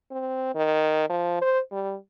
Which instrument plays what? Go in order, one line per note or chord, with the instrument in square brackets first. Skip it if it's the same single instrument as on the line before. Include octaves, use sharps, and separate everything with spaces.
[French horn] C4
D#3
F3
C5
G3